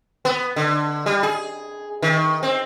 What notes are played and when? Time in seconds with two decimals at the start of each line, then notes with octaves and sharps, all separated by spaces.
0.25 B3
0.56 D3
1.06 G3
1.23 G#4
2.02 D#3
2.43 C4